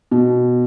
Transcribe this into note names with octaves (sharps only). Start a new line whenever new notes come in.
B2